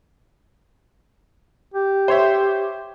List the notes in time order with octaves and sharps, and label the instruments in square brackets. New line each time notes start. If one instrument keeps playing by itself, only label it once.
[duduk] G4
[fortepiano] C5 C#5 E5